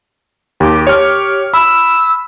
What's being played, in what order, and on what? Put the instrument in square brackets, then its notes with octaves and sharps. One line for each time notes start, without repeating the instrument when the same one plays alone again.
[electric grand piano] D#2 [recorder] G4
[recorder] G4 [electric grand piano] C#5 F6
[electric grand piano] B5 [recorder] E6